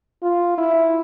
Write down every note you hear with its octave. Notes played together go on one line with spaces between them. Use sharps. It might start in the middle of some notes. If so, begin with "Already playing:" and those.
F4
E4